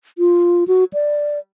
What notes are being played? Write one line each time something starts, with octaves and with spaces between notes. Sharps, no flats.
F4
F#4
D5